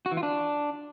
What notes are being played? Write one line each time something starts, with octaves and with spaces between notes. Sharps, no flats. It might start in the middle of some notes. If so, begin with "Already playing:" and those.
F#4
E3
F4
D4